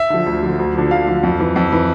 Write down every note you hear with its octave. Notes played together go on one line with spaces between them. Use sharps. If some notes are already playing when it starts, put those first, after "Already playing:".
Already playing: E5
D3 F3
D2
D3 F3
D2
D3 F3
D2 F5
D3 F3
F2
E3
F2
E3